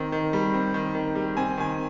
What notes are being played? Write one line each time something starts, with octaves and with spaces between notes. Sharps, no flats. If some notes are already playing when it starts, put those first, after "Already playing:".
Already playing: D#3 C4
D#3
G3
C4
D#3
D#3
G3
C4 G#5
D#3 G#5